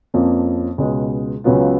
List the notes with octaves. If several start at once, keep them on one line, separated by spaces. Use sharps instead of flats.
F2 F3 A#3 C#4
C#2 B2 G#3
C#2 C#3 F#3 B3 F4